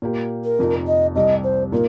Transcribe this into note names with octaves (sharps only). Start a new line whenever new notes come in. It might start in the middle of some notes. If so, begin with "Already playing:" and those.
A#2 A#3 G4
A#4
F1 F2 F3 D#4
D#5
C2 C3 G3 D#5
C5
A#2 A#3 D#4 A#4